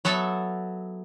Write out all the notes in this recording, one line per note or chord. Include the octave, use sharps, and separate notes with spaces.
F#3 B3 A4 E5